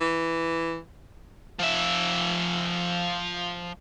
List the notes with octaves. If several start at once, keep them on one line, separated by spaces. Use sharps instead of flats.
E3
F3 E5